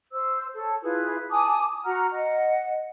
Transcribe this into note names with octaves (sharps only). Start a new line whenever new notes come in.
C5 E6
A4 C#5
E4 F4 G#4 B4
G#5 A5 D6 D#6
F#4 F#5 A#5 F6
D#5 F#5